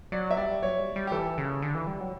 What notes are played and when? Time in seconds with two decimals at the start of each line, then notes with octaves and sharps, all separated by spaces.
0.12 F#3 D5
0.31 E5
0.37 G3 D5
0.63 F#3 C#5
0.79 G3
0.96 G3
1.07 G4
1.12 E3 A4
1.38 C#3
1.62 D3
1.75 E3
1.87 G3
2.00 F#3